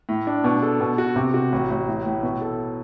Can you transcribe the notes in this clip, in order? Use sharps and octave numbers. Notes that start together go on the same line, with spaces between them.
A2
D4
B2
A4
B2
F#4
C3
F#4
A1
A1
A2
A2
B2
A4